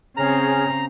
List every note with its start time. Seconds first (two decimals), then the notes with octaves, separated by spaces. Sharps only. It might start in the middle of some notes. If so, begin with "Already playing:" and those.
0.17 C#3 C4 G#4 C#5 A#5 F6